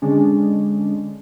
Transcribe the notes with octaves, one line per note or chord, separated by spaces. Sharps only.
D3 G#3 C#4 D4